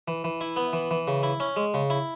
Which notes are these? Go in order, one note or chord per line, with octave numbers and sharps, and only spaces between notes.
E3
E3
E4
B3
E3
E3
C#3
E4
C#4
G#3
C#3
E4